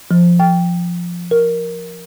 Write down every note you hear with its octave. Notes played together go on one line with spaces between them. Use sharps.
F3
G5
A#4